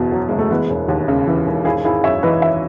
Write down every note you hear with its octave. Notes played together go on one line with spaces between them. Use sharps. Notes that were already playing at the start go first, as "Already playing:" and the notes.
Already playing: F#1 E2 B2
F#3
F#1 G#3
A3
E3 G#3 B3
E1
D#2
C#3
E3
E1
G#1 E4 G#4
G#1 E4 G#4
F#2 C#5 E5
E3 B4 D#5
G#1 C#5 E5